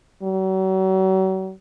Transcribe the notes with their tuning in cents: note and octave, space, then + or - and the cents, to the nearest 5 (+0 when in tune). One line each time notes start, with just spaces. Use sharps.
F#3 +40